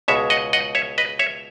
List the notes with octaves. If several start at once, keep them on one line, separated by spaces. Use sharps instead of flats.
C#2 B2 G#3 C#5 E5
D#5 F#5
D#5 F#5
C#5 E5
B4 D#5
C#5 E5